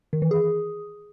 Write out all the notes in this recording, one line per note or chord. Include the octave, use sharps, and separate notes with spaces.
D#3
E3
G#4